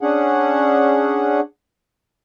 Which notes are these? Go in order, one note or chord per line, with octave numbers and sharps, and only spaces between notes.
C#4 D4 G#4 F#5